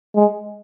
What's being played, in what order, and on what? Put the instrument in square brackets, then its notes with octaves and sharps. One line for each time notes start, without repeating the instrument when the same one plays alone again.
[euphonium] G#3